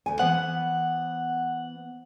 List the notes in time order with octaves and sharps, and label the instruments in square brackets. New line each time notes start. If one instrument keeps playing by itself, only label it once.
[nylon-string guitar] D2 G#5
[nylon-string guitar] E3 B3 C5 [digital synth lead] F#5